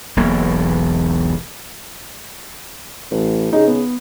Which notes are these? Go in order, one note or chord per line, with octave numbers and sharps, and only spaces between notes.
E1 B1 A#3
A1
C#3 D#4 G#4
B3